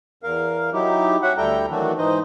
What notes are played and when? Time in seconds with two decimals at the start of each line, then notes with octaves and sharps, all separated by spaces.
0.23 E2 A#4 F5
0.73 F#3 D#4 E4 G4
1.22 C#4 F#4 E5 F#5
1.37 D2 G3 E4 A4 G5 A#5
1.71 D#3 E3 F#3 A3 D4 F#4
1.98 G#2 E3 D#4 C5 D#5